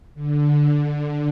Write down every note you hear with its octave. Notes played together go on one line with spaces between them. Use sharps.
D3